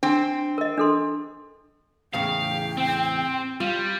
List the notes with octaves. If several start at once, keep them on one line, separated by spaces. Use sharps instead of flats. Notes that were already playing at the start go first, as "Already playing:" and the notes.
C4 D4
A#4 D#5
D4 A4 C6
E2 A2 C#3 F5 G5
C4
G3 F4